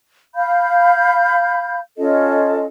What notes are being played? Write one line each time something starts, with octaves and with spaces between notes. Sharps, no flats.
F5 B5 G6
C#4 F4 A4 D#5